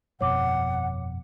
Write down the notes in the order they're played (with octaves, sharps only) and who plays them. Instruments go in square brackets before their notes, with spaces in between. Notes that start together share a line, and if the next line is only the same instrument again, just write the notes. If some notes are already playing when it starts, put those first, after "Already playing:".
[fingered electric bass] G1 F2 B2 [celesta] C#5 D6 [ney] F#5